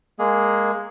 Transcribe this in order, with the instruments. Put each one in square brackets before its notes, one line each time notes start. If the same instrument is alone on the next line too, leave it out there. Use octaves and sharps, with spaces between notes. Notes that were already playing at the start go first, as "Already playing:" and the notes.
[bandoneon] G#3 A#3 G#4